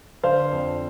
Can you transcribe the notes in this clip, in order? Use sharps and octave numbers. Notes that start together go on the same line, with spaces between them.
D3 C5 F5
F2